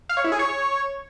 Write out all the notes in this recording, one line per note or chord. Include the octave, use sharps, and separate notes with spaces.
F5
C#5
E4
G#4
C#5